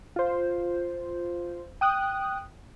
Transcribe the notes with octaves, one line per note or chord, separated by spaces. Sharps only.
F4 C5
G5 D#6 F#6